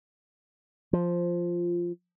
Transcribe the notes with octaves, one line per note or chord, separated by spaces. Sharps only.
F3